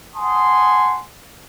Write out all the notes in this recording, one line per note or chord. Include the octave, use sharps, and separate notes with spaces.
F#5 G#5 A5 C6 D#6